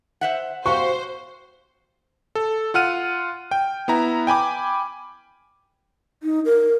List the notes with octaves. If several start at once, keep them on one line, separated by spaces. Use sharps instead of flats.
C5 E5 F#5
F#4 G4 C5 F5 C#6
A4
F4 F#5 F6 D#7
G5
B3 E4 A#5
G5 G#5 B5 D6
D#4
A#4